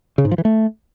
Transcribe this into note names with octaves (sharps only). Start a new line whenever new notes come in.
C#3
G#2
F3
E3
A3